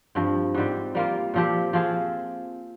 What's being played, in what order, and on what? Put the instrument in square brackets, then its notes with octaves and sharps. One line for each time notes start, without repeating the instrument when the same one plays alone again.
[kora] G2 F3 C4
G#2 G3 C4
G3 A#3 F4
A#2 F3 C4 G4
F3 C4 F4 G#4